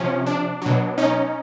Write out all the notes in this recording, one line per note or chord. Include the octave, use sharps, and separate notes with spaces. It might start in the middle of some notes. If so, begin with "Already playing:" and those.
Already playing: C3 F3 C#4
D4
B2 F#3
C#4 D#4